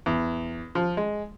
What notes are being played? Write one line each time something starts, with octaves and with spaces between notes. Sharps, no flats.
E2
F3
G#3